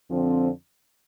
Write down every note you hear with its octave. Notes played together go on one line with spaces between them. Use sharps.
F2 D3 F3 C4